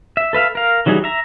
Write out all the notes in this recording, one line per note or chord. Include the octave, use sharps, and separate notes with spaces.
E5
A4 B4 E5 F5
A#4 F5
E3 F#3 G3 D#4 G#4
E5 A#5